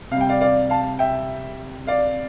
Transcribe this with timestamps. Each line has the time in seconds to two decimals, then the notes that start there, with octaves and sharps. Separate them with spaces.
0.11 C3 G3 F5
0.21 G5
0.29 D5 F5
0.41 D5 F5
0.70 F5 A5
0.99 E5 G5
1.87 D5 F5